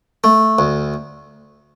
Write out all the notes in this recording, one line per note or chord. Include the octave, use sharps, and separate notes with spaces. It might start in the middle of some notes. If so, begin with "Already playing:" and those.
A3
D2